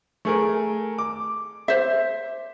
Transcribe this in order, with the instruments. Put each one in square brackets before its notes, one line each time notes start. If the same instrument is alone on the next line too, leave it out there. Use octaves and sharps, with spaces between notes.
[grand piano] A3 G#4 A#4
D6
[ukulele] C5 E5